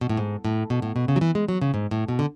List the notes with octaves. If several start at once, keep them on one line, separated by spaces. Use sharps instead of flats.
B2
A2
G#2
A2
B2
A2
B2
C#3
F#3
E3
G#3
F#3
C#3
G#2
A2
B2
D3